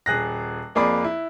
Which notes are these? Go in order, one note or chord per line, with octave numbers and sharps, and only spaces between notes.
D#1 G#4 F#6 A#6
F2 A#3 G#4 D5 B5 D6
E4